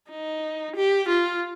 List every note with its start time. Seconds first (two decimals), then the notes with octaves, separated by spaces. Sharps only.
0.11 D#4
0.76 G4
1.09 F4